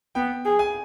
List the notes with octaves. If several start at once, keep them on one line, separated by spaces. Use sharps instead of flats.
B3 G5
G#4
G#5